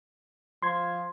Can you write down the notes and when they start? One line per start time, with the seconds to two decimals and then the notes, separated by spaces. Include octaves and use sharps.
0.62 F3 C6 G#6